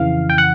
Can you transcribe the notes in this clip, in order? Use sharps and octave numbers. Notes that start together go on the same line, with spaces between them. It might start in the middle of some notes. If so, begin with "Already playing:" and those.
Already playing: F2 C#3 E3 F5
G5
F#5